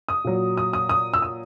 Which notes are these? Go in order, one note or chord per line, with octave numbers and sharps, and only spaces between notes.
D#6
A#2 F#3
D#6
D#6
D#6
E6
D#6